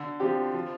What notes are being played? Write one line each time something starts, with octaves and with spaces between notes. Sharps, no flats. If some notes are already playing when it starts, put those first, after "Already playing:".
Already playing: D3
F3 C4 G4
F3